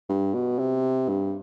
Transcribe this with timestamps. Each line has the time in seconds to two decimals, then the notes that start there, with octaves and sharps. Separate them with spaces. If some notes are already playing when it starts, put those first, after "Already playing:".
0.09 G2
0.34 B2
0.59 C3
1.08 G2